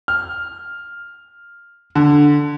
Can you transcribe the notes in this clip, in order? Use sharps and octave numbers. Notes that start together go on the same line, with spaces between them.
F6
D3